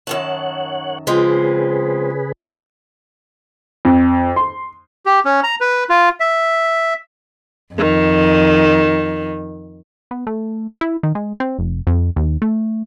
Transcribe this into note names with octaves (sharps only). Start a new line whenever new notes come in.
F#2 D#3 C#5 F#5 A5
C#3 F3 G#3 C4 G#4 B4
F2
C6
G4
C#4
A#5
B4
F4
E5
F2 D#3
B3
A3
E4
D#3
G#3
C4
F1
F2
D#2
A3